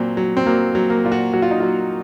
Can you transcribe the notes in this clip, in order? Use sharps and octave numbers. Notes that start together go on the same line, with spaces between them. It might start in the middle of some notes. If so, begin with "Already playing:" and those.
Already playing: A#2 F#3 C4
F#3
C4
F#3 A#3
F#3
A#3
A#2 F4
F#4
F#3 F#4
F4
D#4
F#3 F4